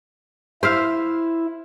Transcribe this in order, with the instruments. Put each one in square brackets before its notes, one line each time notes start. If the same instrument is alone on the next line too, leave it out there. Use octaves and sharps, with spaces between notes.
[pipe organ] E4 [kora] C5 E5 F5